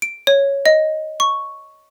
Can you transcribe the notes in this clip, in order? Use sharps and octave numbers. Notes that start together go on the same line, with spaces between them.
D7
C#5
D#5
C#6